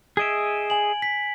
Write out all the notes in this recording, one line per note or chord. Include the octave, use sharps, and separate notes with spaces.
G#4 D#5 E5 G#6 D7
G#5 F#7
B6